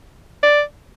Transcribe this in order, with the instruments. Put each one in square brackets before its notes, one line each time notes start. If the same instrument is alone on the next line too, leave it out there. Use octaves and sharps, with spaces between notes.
[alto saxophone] D5